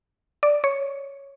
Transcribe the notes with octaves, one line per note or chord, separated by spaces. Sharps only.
D5
C#5